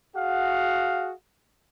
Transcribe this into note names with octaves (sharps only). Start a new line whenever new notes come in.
F#4 G#4 F5 F#5